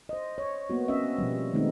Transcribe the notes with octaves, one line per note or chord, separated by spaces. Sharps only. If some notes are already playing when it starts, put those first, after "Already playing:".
C5 D#5
C#5
A#3 B3 F#4
C4 C#4 D#5 E5
B2 F3 G3
D#3 G#3 A3 B3 C4 D#4